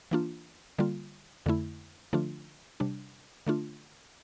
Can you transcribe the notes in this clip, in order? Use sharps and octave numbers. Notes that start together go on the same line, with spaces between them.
E3 A#3 D4 F4
D3 G3 A#3 F4
F2 D3 A3 E4
D3 F3 A3 D4 F4
C3 G3 D4
D3 A3 D4 F4